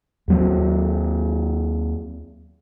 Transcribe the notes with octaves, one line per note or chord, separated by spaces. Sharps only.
D#2 F#3 C4